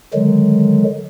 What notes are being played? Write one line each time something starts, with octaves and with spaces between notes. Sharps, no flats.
D3 D#3 F#3 G#3